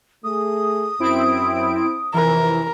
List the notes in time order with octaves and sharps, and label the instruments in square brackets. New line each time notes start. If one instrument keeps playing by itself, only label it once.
[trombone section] A3 G#4 [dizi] D#6
[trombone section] F#2 [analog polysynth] C4 E4 D7
[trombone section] F2 C3 [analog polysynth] E3 [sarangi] A#4